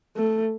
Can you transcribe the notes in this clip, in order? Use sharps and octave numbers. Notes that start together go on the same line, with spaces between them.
A3